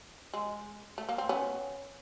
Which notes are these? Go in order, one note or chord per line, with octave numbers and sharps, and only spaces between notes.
G#3
A3
A#3
C4
B3 C#4